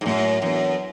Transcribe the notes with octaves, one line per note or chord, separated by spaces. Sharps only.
G#2
F#2 A2
F#2 E3 B3 D4